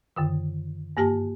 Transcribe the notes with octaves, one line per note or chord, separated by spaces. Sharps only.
F#2 D3 D#3
G2 A#3 G4 G#5 A5